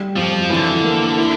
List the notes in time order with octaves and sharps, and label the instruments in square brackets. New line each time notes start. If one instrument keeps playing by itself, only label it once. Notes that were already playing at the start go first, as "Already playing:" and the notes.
Already playing: [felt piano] G3
[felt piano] F2 [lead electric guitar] F3
[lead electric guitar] D3 [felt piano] E3
[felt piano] A#3
E4